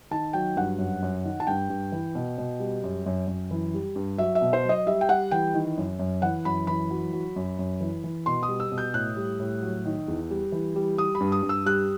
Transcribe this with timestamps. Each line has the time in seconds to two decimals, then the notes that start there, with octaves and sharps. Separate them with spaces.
0.11 D#3 A5
0.33 F#3 G5
0.56 G2 F#5
0.79 F#2
1.02 F#2
1.24 D#3
1.40 A5
1.47 G2 G5
1.70 G2
1.92 E3
2.15 B2
2.38 B2
2.60 G3
2.84 F#2
3.06 F#2
3.28 F#2
3.51 E3
3.74 G3
3.96 G2
4.18 F#3 E5
4.35 E5
4.42 B2
4.53 C5
4.65 F#3 D#5
4.87 G3 E5
5.01 G5
5.09 G3 F#5
5.31 E3 G5
5.54 D#3
5.78 F#2
5.99 F#2
6.22 E3 F#5
6.45 F#2 B5
6.67 E3 B5
6.91 F#3
7.13 F#3
7.36 F#2
7.59 F#2
7.80 E3
8.04 E3
8.26 B2 C6
8.43 D#6
8.48 G3
8.60 E6
8.71 B2
8.78 G6
8.94 A2 F#6
9.17 G3
9.40 A2
9.63 F#3
9.85 D#3
10.08 E2
10.31 G3
10.52 E3
10.76 G3
10.98 G3 D#6
11.15 B5
11.20 G2
11.32 D#6
11.43 G2
11.49 E6
11.66 G3 F#6